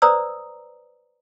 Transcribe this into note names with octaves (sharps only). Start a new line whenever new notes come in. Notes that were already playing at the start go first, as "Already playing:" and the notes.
B4 C5 D5 A#5 D#6 E6